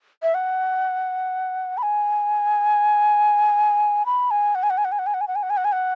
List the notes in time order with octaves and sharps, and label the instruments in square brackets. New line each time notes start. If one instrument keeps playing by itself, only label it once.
[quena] E5
F#5
B5
G#5
B5
G#5
F#5
G#5
F#5
G#5
F#5
G#5
F#5
G#5
F#5
G#5
F#5
G#5
F#5
G#5
F#5
G#5
F#5